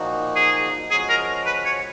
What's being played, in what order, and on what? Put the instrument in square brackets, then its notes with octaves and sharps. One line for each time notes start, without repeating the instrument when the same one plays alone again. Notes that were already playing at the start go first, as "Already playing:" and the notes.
Already playing: [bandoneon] A#2 F3 A#3 D#4 F#4
[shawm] G#4
[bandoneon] F3 G#3 C#4 F#4 [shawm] G#4
[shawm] A#4
B4
C#5